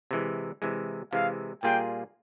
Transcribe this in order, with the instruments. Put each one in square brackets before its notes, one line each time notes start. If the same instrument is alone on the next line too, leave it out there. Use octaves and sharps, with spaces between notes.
[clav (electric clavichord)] C3 E3 G#3
C3 E3 G#3
[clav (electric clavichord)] C3 E3 G#3 [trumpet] F5
[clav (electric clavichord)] A#2 G3 A#3 F4 G#4 [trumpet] G5